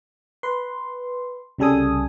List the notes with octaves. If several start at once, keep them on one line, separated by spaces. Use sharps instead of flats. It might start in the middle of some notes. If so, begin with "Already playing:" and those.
B4 C6
C2 C#3 G3 A4 G#5 D#6